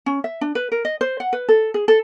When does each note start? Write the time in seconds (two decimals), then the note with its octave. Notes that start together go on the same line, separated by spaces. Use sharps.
0.06 C#4
0.24 E5
0.41 D4
0.55 B4
0.72 A#4
0.85 D#5
1.01 C5
1.20 F#5
1.33 B4
1.49 A4
1.74 G#4
1.88 A4